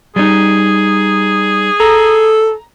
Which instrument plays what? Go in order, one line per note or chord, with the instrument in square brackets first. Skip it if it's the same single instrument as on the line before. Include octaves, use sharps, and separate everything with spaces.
[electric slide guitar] G3 D#4 [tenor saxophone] G#4
[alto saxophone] A4 [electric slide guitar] A#5